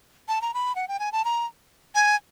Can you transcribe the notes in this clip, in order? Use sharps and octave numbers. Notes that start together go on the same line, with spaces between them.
A5
A#5
B5
F#5
G5
G#5
A5
A#5
G#5